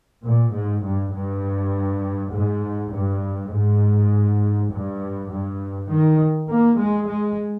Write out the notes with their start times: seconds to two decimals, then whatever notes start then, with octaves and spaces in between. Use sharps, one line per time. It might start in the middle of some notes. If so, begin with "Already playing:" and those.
0.25 A#2
0.54 G#2
0.84 G2
1.14 G2
2.33 G#2
2.93 G2
3.53 G#2
4.72 G2
5.31 G2
5.90 D#3
6.51 A#3
6.80 G#3
7.10 G#3